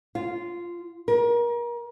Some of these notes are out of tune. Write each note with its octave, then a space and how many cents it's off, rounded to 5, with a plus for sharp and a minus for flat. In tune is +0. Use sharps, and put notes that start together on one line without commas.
F4 -10
A#4 +30